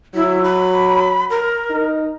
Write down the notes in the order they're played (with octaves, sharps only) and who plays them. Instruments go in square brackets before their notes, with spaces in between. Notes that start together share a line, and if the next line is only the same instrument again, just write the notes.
[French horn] F#3 [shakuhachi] E4
[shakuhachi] B5
A#4
[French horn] D#4